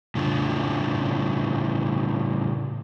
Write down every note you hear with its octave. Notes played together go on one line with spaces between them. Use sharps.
A2 C#3 D4 F4